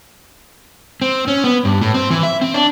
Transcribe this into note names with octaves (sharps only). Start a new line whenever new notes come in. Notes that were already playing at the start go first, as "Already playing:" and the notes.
C4
C#4
B3
G2
A2
C4
E3
E5
C4
D4